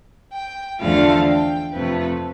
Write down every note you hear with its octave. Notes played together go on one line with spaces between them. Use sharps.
G5
E2 D3 F3 A3 F5
G5
F2 C3 F3 A3 B4